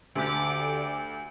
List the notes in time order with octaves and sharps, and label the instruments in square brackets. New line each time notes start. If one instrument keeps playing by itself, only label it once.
[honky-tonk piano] D2 [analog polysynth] D3 G4 D6